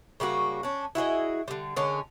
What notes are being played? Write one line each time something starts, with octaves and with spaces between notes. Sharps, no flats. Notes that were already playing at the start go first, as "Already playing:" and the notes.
C#3 G3 A#3 F#4
C#4 D4
E4 F#4 G#4 D#5
D3 G3
D3 G#3 C#4 A#4